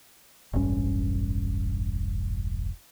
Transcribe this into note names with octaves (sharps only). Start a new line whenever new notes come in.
E1 A1 G2 C#4